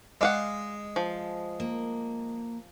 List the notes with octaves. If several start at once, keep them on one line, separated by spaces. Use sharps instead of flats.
G#3 D5 F5 F#5
F3
A#3